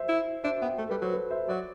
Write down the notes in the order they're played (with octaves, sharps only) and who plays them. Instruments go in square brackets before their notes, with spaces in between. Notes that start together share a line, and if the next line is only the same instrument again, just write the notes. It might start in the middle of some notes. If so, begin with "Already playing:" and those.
Already playing: [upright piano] C5 E5
[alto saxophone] E4
[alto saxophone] D4 [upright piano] C5 E5
[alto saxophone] B3 [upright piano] E5 G5
[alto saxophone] A3 [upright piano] A4
[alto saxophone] G3 [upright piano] B4
[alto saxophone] F#3 [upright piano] A4 C5
[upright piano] B4
C5 E5
[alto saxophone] F#3 [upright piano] D5 F#5